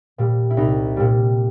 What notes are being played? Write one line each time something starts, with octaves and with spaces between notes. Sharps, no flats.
A#2 G3
E4
C2 D#4
A#2 G3